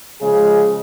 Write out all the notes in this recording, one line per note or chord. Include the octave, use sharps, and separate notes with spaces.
C#3 F3 G#3 G#4